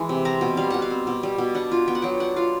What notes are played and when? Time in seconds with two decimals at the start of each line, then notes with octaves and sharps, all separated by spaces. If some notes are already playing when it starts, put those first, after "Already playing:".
Already playing: E3 G#3
0.09 C3
0.25 C4 A#5
0.41 B2
0.57 G3 F5
0.70 B2 F#5
0.82 F5
0.90 C4
1.07 B2
1.23 G3
1.38 B2
1.55 D4 F#5
1.71 F4
1.88 B3 G5
1.95 F#5
2.02 F#3 G5
2.20 D4 F#5
2.36 F4 F5